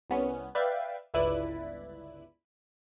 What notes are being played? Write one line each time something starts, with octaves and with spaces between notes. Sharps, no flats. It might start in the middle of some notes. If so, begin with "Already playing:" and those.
C2 B3 C#4
B4 D5 E5 F5 G5
G1 C#2 E4 B4 D5 B5